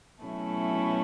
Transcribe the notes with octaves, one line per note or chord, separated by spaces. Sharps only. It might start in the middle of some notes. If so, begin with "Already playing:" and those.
B2 F#3 A3 C#4 E4